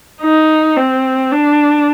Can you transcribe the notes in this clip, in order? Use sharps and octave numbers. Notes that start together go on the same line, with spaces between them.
D#4
C4
D4